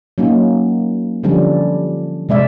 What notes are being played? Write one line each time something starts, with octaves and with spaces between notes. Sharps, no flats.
F#3 A#3 C#4 D#4
D3 F3 G3 C#4 D4
C3 G#3 D5 E5